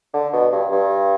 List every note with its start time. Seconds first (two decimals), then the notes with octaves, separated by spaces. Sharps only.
0.14 D3
0.33 B2
0.52 G2
0.72 G2